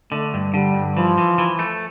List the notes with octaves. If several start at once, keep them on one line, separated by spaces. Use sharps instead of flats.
D3 A3
G2
D3 G3
G2
E3 F3
E3
E3
A3